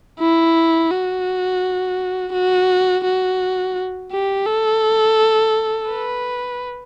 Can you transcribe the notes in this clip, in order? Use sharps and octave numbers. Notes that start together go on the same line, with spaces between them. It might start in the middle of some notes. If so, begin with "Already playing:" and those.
E4
F#4
F#4
F#4
G4
A4
B4